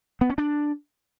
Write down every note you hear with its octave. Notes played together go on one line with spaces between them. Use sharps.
B3
C#4
D4